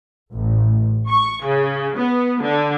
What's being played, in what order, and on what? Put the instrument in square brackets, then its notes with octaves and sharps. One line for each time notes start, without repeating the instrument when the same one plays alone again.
[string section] A1
C#6
C#3
B3
D3